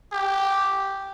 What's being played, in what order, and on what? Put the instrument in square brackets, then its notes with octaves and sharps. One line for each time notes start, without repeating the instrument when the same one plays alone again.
[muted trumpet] G4